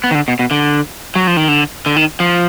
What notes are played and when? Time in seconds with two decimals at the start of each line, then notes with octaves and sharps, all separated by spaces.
0.04 B3
0.11 D#3
0.15 D3
0.28 B2
0.39 B2
0.51 D3
1.16 F#3
1.27 F3
1.37 D#3
1.48 D3
1.86 D3
1.96 D#3
2.20 F3